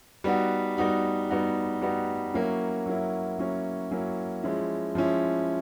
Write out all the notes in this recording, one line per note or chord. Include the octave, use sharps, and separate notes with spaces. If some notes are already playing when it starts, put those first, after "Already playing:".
G3 B3 D#4 F#4
G3 B3 D#4 F#4
G3 B3 D#4 F#4
G3 B3 D#4 F#4
F#3 A#3 C#4 E4
F#3 A#3 C#4 E4
F#3 A#3 C#4 E4
F#3 A#3 C#4 E4
F3 G#3 C#4 E4
F3 G#3 C#4 E4